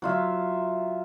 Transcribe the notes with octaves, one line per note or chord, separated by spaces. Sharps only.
F#3 F4 E5